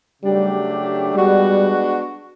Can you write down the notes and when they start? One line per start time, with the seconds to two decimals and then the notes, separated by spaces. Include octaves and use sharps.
0.23 C#3 F#3 G3 A3 D4 G4
1.15 G3 G#3 B3 D4 F#4